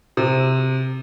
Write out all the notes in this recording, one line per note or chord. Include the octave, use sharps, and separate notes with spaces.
C3